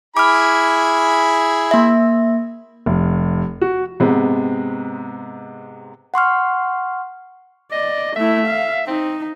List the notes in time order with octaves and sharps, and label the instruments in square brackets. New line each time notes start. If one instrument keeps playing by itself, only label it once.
[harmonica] E4 G#4 B5 [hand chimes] D6 F6
[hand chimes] A#3 E5
[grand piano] F1
F#4
[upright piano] G#2 C3 G#3 B3
[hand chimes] F#5 C6 C#6 F6
[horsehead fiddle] D5 [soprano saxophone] D#5
[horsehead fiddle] A3 E4 [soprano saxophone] E5
[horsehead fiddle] F5
[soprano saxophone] C4 [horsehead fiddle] D#4